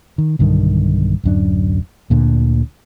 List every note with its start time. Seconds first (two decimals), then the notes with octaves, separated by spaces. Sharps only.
0.18 D#3
0.39 B1 G2 D3 D#3
1.24 D1 F#2 D4
2.10 D2 A#2 D3